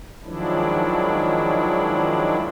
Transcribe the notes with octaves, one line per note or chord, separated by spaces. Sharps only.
D#3 F3 F#3 G#3 D4 E4